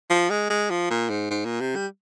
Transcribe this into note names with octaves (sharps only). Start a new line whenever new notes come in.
F3
G#3
G#3
F3
A#2
G#2
G#2
A#2
C3
G3